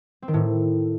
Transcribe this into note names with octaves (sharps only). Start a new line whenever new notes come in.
C4
D#3
A2